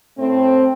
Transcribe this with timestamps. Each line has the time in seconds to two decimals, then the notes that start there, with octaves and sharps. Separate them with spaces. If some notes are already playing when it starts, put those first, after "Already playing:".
0.18 A2 A3 C4